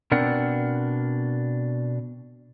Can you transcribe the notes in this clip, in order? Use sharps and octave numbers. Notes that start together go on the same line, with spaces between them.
B2 C4 D4 A#4 F#5